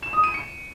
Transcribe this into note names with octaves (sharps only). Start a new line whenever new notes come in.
E7
D#6
D#7
C#7